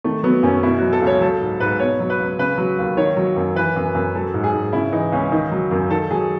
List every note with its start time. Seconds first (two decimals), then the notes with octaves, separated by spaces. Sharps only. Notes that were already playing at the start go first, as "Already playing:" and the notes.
0.04 D#3 A3
0.23 F#3 B3
0.43 F#2 C#4
0.63 B2 E4
0.78 F#3 F#4
0.93 A4
1.02 C#2 C#5
1.21 F#3 A4
1.42 G#2
1.60 G#2 B4
1.80 B2 C#5
2.00 F#3
2.10 B4
2.20 C#2
2.38 C#3 B4
2.58 F#3
2.78 D#2
2.97 D#3 C#5
3.17 F#3
3.36 F#2
3.55 E3 B4
3.76 F#2
3.95 F#2
4.15 F#3 A4
4.34 G#2
4.44 G#4
4.53 G#2
4.73 C#3 E4
4.92 E3 D#4
5.12 C#2 C#4
5.32 D#3 D#4
5.52 F#3
5.71 F#2
5.90 D#3 A4
6.10 F#3 G#4